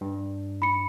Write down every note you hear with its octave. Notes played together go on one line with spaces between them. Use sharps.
G2
B5 C#7